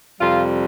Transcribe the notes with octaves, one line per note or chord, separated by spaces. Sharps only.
F2 C3 G3 F4